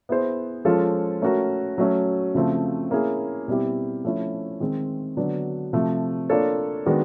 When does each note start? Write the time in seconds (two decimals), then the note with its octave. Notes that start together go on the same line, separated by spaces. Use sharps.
0.09 B3 E4 G#4 C5
0.65 F3 G#3 C#4 F4 A4
1.22 A3 C#4 F#4 A#4
1.78 F#3 A3 C#4
2.35 C#3 F3 A3 C4
2.91 A#3 C#4 E4 G#4
3.48 B2 G3 C4 E4 G4
4.05 F3 A3 C#4 E4
4.60 D#3 G#3 C4
5.17 D3 F#3 B3 D4
5.73 C3 F3 A3
6.29 A#3 D4 F4 A4 C#5
6.86 D#3 G#3 B3 D4 F#4